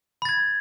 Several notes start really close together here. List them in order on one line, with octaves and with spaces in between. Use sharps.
B5 A6 G#6